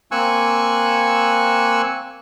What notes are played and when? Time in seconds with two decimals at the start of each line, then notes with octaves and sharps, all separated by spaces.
0.11 A#3 C4 G#5 C#6 E6 F#6